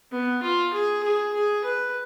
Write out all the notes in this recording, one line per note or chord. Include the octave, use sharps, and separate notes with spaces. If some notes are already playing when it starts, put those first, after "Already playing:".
B3
F4
G#4
G#4
G#4
B4